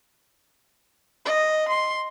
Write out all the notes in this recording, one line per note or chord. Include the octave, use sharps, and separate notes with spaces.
D#5
C6